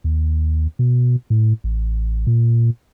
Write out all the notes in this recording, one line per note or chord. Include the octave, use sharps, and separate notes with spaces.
D#2
B2
A2
A1
A#2